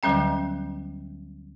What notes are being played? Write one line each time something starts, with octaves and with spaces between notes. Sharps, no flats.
D2 D3 F#3 G3 C#4 G5